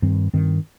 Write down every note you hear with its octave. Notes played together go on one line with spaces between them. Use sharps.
G2 D#3 C4
G2 D#3 C4